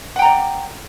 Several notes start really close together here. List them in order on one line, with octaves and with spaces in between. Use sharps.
F#5 G5 A#5 D5